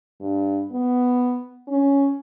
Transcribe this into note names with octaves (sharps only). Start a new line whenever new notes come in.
G2
B3
C#4